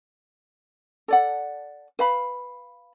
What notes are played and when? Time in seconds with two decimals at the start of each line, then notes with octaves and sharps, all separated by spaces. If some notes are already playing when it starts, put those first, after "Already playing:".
1.08 A4 D5 F#5
1.99 B4 F5 B5